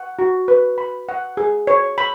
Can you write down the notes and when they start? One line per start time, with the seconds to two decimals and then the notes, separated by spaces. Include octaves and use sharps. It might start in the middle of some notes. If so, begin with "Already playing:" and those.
Already playing: F#5
0.19 F#4
0.48 B4
0.78 B5
1.09 F#5
1.37 G#4
1.67 C#5
1.98 B5